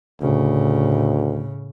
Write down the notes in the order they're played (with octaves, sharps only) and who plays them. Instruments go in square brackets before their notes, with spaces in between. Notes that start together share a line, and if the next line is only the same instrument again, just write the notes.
[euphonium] D2 [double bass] A2 C#3